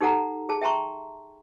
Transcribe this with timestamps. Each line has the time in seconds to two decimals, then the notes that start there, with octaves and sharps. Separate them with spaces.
0.01 D#4 G4 A4 F#5 A#5
0.49 G#4 A5
0.61 E5 G5 A5 A#5 C6 C#6